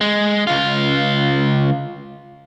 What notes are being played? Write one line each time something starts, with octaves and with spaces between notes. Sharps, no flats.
G#3
C#2 F4